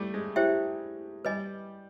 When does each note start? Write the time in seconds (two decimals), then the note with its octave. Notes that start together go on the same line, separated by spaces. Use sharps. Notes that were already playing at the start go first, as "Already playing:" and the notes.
Already playing: G3 A3
0.14 G#3
0.36 E4 G4 C5 E5 G5
1.25 G3 B4 D#5 G#5